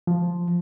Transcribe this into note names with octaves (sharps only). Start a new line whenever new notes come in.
F3